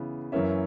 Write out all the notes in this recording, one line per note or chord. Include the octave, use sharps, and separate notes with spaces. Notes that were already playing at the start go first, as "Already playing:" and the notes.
Already playing: C#3 E3 B3
F#2 E3 A#3 C#4 E5